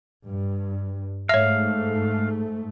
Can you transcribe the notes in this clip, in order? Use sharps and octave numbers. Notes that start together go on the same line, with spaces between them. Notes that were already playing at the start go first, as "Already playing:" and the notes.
G2
G#2 A3 C#5 E5 F5